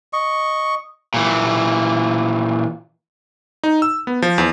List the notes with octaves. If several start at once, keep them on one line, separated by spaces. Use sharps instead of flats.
D#5 C#6
A#2 E3
D#4
E6
B3
F3
E2